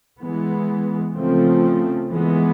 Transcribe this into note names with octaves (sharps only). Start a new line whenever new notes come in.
E3 G#3 B3
C#3 F3 A3 C4
E3 G#3 B3